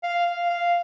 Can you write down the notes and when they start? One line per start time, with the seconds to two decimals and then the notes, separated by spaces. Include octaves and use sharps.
0.03 F5
0.27 F5
0.50 F5